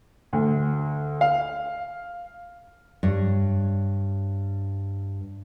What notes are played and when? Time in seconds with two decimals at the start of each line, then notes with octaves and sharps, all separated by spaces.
0.33 D2
1.21 F5
3.03 G2 C#5